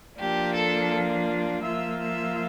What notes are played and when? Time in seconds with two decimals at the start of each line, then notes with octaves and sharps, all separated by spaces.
0.18 F3 A#3 D4 F4 G4
0.54 A4
1.63 F3 A#3 F4 E5
2.00 E5